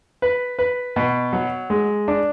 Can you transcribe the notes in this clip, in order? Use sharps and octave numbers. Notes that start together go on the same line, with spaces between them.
B4
B4
B2
F#3
G#3
D4